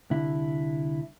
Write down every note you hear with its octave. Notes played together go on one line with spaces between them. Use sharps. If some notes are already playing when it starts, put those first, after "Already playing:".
C2 D3 E4